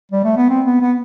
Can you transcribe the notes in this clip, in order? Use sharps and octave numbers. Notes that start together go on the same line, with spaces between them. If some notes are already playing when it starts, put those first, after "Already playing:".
G3
A3
B3
C4
B3
B3